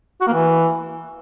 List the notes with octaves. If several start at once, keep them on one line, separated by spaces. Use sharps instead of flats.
F#4
A#3
E3